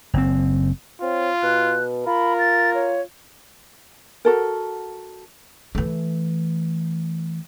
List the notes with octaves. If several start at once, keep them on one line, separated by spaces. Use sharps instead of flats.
F#1 C4
C4 F4 C#5
B2 F#6
F4 A#4 B5
A6
C#5
F#4 A4 A#4
E3 A3